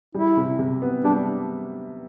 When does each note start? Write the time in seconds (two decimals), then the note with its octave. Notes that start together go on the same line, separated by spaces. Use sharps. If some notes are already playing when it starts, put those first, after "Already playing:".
0.14 G3 E4
0.37 C3
0.59 C3
0.82 B3
1.04 G3 D4